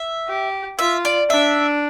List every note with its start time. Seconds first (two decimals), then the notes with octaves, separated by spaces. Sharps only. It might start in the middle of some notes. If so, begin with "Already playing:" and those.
Already playing: E5
0.28 G4
0.79 F4 E5
1.05 D5
1.30 D4 E5